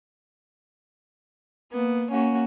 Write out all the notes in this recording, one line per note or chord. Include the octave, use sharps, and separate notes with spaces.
A#3 B3
A#3 C#4 F#4